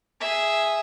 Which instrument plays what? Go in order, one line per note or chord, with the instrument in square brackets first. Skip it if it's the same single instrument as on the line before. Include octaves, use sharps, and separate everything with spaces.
[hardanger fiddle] G#4 E5